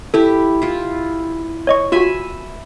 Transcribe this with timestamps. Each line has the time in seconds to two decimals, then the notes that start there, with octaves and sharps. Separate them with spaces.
0.14 E4 G4 A4
0.62 E4 F4
1.67 C#5 D#5 C#6
1.92 F4 F#4 E5 G#5 B5